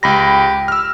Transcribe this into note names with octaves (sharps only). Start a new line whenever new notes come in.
C#2 G4 B5 A#6
E6 F6